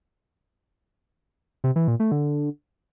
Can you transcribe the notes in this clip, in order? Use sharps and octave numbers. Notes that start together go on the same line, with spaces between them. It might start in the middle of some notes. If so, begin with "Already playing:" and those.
C3
E3
A#2
A3
D3